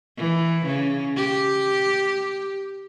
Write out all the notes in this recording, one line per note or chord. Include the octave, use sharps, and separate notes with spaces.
E3
C#3
G4